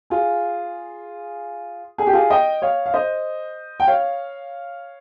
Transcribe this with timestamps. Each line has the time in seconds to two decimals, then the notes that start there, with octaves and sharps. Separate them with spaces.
0.10 F4 G#4
1.98 G#4
2.07 G4
2.13 F4 G#4
2.30 D#5 G5
2.62 C#5 F5
2.86 F5
2.94 C5 D#5
3.80 G5
3.87 C#5 F5